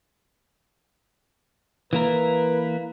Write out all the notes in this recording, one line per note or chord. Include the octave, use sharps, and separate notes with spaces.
E3 A#3 A#4 B4